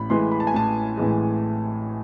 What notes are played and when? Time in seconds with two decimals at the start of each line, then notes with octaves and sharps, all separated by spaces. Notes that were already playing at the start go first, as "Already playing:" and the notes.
Already playing: A1 B5
0.10 A2 E3 G#3 C6
0.32 B5
0.40 A5
0.47 G#5
0.54 A1 A5
0.97 A2 E3 G#3